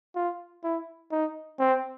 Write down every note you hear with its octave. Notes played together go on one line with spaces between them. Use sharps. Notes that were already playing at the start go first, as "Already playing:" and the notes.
F4
E4
D#4
C4